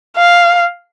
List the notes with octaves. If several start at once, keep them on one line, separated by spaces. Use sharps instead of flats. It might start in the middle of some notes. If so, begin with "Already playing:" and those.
F5